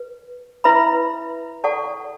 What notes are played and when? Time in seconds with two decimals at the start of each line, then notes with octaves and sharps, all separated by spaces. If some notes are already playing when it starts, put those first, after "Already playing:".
Already playing: B4
0.64 E4 B4 E5 B5
1.64 A4 D5 F#5 A5 C#6